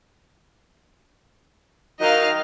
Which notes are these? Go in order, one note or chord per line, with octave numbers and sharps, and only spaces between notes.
D#3 F#3 D#4 D#5 F5